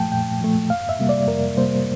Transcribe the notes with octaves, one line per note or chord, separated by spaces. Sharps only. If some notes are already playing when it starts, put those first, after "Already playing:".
Already playing: A#2 F3 A3 G5 A5
A#2 G5
F3 A3
F2 F5
E5
C3 G3 A#3
D5
F2 A#4
C3 G3 A#3 C5